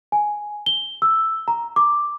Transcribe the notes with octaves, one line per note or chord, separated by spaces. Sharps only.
G#5
G7
E6
A#5
D6